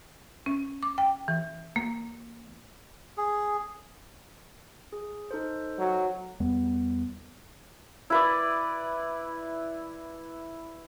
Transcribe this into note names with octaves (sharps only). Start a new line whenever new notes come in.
C#4
D6
G5
E3
A#3
G#4
G#4
D#4 A4 C5
F#3
E2 G3 B3
E4 B4 D5